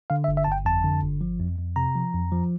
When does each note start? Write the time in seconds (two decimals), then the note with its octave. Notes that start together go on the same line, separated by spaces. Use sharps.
0.10 D3 F5
0.24 E5
0.28 G1
0.37 E5
0.44 A5
0.47 G1 G5
0.65 F2 A5
0.84 D3
1.02 G1
1.21 F3
1.40 F2
1.58 F2
1.76 C3 A#5
1.95 F3
2.14 F2
2.32 F3